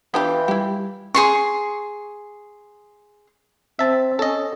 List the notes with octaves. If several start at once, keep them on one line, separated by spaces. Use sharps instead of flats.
E3 B3 D4 F4 G4 G5 B5
G3 E4 G4
G#4 C6 C#6
C4 E5 A5
C#4 A4 D#5